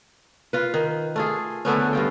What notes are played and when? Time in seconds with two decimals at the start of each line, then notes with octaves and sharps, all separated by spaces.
0.53 F4 B4
0.74 D#3
1.16 A3 F4 G#4
1.65 D3 A3 B3 C#4
1.93 G2 F4 G5